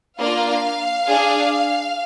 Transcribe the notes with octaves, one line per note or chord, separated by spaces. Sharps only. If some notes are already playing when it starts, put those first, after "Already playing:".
A#3 D4 F4 F5
D4 G#4